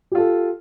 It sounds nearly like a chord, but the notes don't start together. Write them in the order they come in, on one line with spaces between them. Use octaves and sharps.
G4 F4 A4